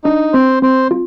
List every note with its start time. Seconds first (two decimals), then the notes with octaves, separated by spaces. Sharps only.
0.04 D4 D#4
0.33 C4 C5
0.62 C4 C5
0.91 F4